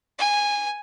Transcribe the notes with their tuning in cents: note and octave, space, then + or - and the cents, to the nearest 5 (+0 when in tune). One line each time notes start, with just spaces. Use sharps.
G#5 -10